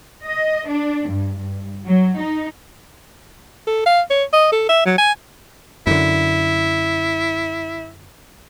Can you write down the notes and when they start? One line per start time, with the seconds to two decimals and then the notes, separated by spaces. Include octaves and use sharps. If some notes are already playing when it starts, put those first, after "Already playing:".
0.25 D#5
0.68 D4
1.08 G2
1.38 G2
1.86 F#3
2.18 D#4
3.67 A4
3.86 F5
4.10 C#5
4.33 D#5
4.52 A4
4.68 E5
4.86 F#3
4.98 G#5
5.87 F#2 D3 E4